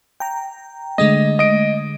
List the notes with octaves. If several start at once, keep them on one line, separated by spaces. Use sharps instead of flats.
G5 A#5
D3 G#3 A3 D#5
D#5 D7